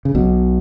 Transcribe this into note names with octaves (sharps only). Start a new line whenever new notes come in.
C#3
B1 B2